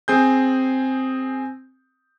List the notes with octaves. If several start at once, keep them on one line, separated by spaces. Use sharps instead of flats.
C4 G#4 G6